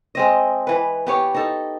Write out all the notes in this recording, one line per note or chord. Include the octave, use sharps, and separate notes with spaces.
G#3 C4 D#5
E3 B4
B3 G4 C#5
D#4 A4